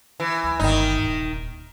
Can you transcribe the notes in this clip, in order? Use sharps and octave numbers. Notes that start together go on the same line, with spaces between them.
E3
D2
G1 D3 D#3 D#4
D#1